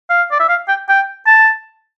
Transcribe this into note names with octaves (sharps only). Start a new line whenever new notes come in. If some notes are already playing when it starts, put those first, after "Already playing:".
F5
D5
E5
F5
G5
G5
A5